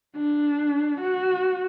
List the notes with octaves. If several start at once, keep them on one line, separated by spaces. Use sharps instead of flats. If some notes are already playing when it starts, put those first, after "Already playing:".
D4
F#4